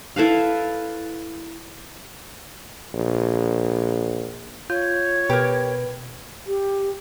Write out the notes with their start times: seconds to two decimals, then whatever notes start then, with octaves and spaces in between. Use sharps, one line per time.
0.16 E4 A4 B4 F5
2.94 A#1
4.70 F4 C#5 G6
5.30 B2 G4 A#4 B4
6.47 G4